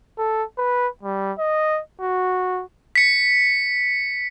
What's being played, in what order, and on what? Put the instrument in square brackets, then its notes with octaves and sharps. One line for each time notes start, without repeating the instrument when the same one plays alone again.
[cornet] A4
B4
G3
D#5
F#4
[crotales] B6 C#7